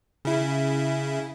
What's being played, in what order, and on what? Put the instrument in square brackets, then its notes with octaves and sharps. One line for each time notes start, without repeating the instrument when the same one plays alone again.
[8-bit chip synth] C#3 E4